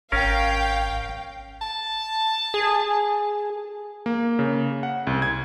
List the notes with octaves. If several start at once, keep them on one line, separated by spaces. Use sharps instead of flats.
G#1 C#4 A#4 F5 G5
A5
G#4
A#3
C#3
F#5
C2
G#6